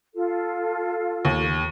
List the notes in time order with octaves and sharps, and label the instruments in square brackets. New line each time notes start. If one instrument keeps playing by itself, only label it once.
[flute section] F4 A4
[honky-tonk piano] D#2